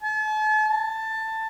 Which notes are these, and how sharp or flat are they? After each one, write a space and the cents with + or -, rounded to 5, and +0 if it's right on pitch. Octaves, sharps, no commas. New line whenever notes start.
A5 -40
A5 +15